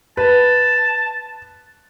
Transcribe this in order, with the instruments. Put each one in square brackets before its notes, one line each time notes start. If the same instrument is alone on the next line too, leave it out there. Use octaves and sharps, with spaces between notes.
[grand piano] B4 [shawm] A5